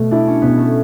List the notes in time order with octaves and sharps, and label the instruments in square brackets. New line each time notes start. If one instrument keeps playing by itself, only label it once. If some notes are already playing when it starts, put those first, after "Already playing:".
Already playing: [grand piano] B2 A3
[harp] D4 [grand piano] E4
[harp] C#4
[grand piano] B2 [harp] B3
[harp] A3